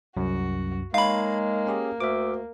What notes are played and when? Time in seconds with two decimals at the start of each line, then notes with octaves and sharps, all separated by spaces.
0.17 C2 F#2 F#4
0.94 G#3 A#3 D#4 C#5 F5 B5
1.67 C#4 G4 G#4
2.00 D2 E5 D6